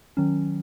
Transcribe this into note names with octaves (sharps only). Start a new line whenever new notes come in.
D#3 F#3 C#4